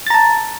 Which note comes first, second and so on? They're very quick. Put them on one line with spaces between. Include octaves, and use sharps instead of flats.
A6 A#5 A5